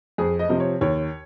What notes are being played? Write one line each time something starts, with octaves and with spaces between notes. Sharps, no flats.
F2 G#4
D#5
C3 F3 C4
C#5
D#2 C#5